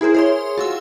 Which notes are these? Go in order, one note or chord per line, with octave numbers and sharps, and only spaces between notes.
E4 G#4 A#4 C5
G#4 C#5 C6
F4 F#4 E6